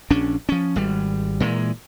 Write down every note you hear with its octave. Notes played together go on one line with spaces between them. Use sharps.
A#1 C#4 D4
F3 C#4
G#1 G3
A#2 E3 F#3 G#3